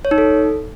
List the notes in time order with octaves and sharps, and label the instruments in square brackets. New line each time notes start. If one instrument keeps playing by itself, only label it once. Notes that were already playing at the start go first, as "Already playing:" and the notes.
[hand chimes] C#5
D#4
A4